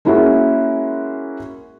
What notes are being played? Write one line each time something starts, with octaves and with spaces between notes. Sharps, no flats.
G#3 A#3 C#4 E4 F#4